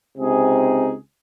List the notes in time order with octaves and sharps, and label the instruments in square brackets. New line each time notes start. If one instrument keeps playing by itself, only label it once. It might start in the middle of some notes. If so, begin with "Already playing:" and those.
[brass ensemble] C#2 C3 C4 D#4 G#4